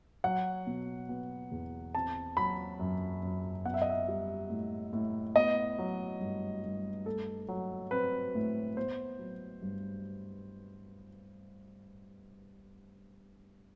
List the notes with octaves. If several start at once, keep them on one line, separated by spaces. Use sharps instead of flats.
F#3 F#5
B2
B3
E2
C4 A5
F#3 B5
F#2
F#2
B3 F#5
E5
D#5
E5
G3
A2
A2
B3 D#5
F#3
G2
G2
A3 A4
F#3
C4 B4
A2
B3 C5
F#3
G2